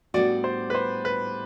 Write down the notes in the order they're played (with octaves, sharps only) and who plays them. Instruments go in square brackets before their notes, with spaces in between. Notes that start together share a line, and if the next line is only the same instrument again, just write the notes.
[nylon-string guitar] A2 G3 B3 D4 F#4 [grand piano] D5
[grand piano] C5
B4
C5
B4